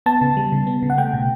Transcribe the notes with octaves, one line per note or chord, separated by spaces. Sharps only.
B3 A5
C#3
G3
C#3
B3
C#3
F#5
A3 G5
B2